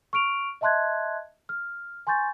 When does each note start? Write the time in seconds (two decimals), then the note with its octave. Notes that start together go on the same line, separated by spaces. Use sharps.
0.13 C#6 F6 D7 F7
0.61 D#5 E5 A5 C6 F#6 G#6
1.49 F6
2.07 G#5 C6 C#6 G6 A6